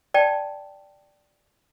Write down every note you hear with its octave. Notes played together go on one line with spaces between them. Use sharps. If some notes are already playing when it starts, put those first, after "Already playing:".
D5 G5 A5